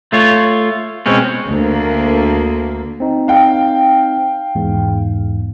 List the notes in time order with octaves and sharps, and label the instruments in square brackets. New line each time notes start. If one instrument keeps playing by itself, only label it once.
[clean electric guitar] A3 F4 C#5
B2 G#3 C4 C#4
[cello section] D2 A#3
[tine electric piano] C4 D#4
[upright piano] F5 G5
[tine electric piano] E2 G#2